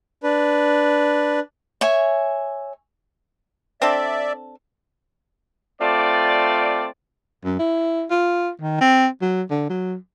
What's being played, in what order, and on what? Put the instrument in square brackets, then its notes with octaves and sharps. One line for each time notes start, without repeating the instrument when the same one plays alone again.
[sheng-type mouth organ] D4 B4
[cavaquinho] C#5 E5 G#5
[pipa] C4 D4 A4 [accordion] D5 E5
[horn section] A3 C4 F4 D5
[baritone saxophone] F#2
E4
F4
D#3
C4
F#3
D3
F#3